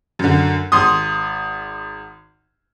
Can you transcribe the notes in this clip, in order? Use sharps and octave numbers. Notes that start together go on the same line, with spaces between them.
F#2 D3
G#1 C6 D#6